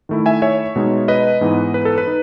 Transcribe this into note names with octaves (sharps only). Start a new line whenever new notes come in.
D#3 A3 E4
E5 G#5
C#5 E5
B2 G#3 D#4
B4 D#5
G#2 E3 B3 D#4
B4
A4
B4
D#4